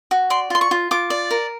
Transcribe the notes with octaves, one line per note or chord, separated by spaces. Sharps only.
F#4
D5 C6
F4 C6
C#6
F4
F4 D6
D5
A#4